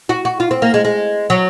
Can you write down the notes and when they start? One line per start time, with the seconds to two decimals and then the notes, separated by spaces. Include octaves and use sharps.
0.09 F#4
0.25 F#4
0.40 F4
0.51 C4
0.62 A#3
0.74 G#3
0.85 G#3
1.30 F#3